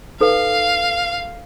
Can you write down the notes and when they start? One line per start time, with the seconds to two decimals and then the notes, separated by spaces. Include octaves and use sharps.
0.21 D#4 A4 B4 F5